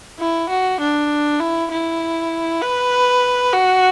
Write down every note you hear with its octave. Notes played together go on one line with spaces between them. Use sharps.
E4
F#4
D4
E4
E4
B4
F#4